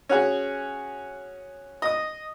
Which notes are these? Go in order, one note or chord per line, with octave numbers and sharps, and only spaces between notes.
C#4 F#4 G#4
D#5 D#6